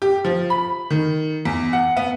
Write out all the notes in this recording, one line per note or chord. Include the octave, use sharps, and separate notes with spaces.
G4
F3
B5
D#3
E2
F#5
B3